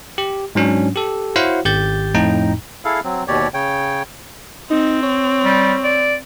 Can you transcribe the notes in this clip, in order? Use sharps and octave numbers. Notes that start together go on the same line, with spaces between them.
G4
G#2 F#3 C#4 D4
G4 A4
E4 F#4 C5 C#5 F5 F#5
G#1 G4 G6 A6
F2 A2 D#4 G5 A#5
E4 G#4 A4 F5
F#3 C4
D#2 B2 G4 C#5 D5
C#3 C#5 G5
C4 D#4
C#5
G3
D5